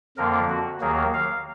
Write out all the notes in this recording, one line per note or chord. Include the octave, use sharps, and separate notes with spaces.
F2 D3 F3 A#3 A#4
F#4
D#2 D#3 F#3 A#3 G#4
F5